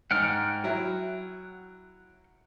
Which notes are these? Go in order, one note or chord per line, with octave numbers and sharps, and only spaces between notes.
G#2 F#5 G5 F6
F#3 E4